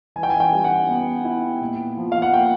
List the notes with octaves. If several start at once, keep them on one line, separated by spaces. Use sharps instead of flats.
E3 G#5
G5
G#5
G5
G3
F#5
B3
E4
A#2
F3
F5
F#5
A#3 G5